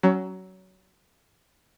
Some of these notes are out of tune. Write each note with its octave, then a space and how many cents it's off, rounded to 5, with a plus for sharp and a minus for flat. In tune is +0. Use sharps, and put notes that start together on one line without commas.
F#3 +20 C#4 +0